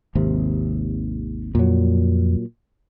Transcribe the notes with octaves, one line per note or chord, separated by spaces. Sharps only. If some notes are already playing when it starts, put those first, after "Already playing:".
G#1 D#2 C3
F2 A#2 F#3